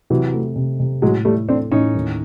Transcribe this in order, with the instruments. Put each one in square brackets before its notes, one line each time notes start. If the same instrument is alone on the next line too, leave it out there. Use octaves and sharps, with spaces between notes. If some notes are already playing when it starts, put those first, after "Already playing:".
[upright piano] C3 [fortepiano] E3 F#3
[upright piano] A3
C3
C3
[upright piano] A2 [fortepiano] F#3 G#3
[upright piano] A2 [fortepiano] G3 A3
[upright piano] A3 [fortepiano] C4 D4
[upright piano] A2 [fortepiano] C#4 D#4
[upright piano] D#2